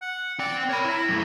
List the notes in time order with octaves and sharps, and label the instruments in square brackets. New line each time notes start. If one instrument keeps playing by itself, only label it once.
[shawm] F#5
[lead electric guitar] C4 G5 [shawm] D5
[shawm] A#4 [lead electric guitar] C#5 B5
[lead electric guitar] E4 [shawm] A#5
[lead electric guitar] F#2 A3